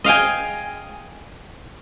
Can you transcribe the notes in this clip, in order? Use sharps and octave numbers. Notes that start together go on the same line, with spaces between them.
D#5 F5 G5 G#5